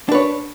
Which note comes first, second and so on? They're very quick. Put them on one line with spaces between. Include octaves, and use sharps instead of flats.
D4 B4 C#5